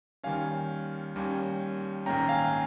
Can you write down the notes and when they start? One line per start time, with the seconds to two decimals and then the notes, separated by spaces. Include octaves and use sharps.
0.23 D#2 D#3 G3 C#4 F5 G#5
1.16 D#2 D#3 G3 C#4
2.06 A#1 G#2 D#3 A#3 C#4 G5 A#5
2.29 F5 G#5